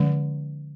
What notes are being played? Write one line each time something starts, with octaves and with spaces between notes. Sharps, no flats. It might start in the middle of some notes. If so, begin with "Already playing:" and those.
Already playing: D3 F3 G#3 C#4